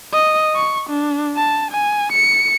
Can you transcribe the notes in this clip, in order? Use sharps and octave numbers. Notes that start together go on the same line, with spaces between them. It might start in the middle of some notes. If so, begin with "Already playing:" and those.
D#5
C#6
D4
A5
G#5
C#7